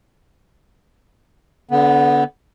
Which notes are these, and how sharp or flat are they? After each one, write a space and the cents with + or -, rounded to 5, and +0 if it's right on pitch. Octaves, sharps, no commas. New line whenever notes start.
D3 -25 B3 +0